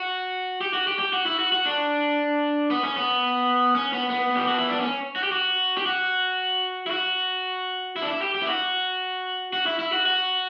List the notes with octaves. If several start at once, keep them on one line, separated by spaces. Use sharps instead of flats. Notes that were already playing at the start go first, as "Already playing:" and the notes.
Already playing: F#4
G4
F#4
G4
G4
F#4
E4
F#4
F#4
D4
B3
C#4
B3
C#4
B3
B3
G4
F#4
E4
D4
C#4
F#4
G4
F#4
G4
F#4
E4
F#4
E4
D4
E4
G4
G4
E4
F#4
F#4
E4
E4
F#4
F#4